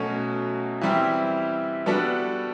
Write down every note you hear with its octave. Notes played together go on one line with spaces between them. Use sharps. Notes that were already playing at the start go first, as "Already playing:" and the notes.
Already playing: B2 F#3 A3 C#4
E3 G3 C4 E4 G4
G3 B3 D4 F#4 A4